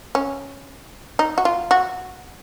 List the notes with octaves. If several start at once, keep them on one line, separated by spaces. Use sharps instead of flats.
C#4
D#4
F#4
F4
F#4